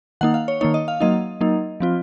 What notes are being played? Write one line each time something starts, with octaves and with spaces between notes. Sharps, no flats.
D#3 A#3 D#4 F#5
F5
C#5
D#3 A#3 D#4 C#5
D#5
F5
F#3 A#3 D#4 D#5
F#3 A#3 D#4
F3 C4 F4